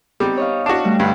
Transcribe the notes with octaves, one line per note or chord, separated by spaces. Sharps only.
G3 B3 C4 D#4
C#5 D#5 F5
D4 F#4
G3 A3
G2 D3